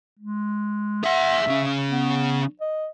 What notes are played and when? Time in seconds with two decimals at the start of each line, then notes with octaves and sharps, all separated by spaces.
0.19 G#3
1.04 G#4 E5 F#5
1.47 C#3 C#4
1.90 B3
2.61 D#5